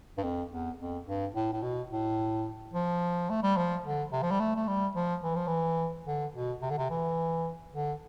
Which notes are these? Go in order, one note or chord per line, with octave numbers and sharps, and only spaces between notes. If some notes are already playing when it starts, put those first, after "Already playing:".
G2
F2
E2
F2
G2
A2
A2
B2
A2
F3
A3
G3
F3
D3
C3
F3
G3
A3
A3
G3
F3
E3
F3
E3
D3
B2
C3
D3
C3
E3
D3